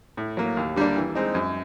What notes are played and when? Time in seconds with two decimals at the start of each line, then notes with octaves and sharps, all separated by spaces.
0.17 A2
0.37 F#3 A#3
0.57 D#2
0.76 D3 G3 A#3 D4
0.96 E3
1.15 G#3 C4 D#4
1.35 F#2